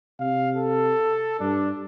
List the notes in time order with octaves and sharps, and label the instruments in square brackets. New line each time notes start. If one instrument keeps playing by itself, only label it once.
[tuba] C3 [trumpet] F5
[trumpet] A4
[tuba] G2 [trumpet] D4